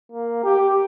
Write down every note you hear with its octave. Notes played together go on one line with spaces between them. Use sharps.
A#3
G4